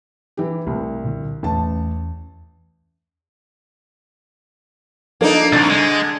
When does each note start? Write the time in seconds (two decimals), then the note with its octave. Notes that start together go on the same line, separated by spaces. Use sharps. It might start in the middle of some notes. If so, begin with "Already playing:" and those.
0.37 E3 G4
0.67 C2 C3 A3 A#3
1.04 A#2 D3
1.43 A1 E2 C#4 A5
5.21 F3 A#3 D4 D#4 A4
5.52 C2 D3 A#5 A6
5.70 G#3